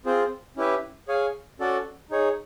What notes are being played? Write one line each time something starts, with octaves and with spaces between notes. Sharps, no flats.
C4 F4 G#4 C5
C#4 E4 G4 B4 E5
G#4 C#5 F5 G#5
C#4 F#4 A4 D5 F#5
D#4 G#4 C#5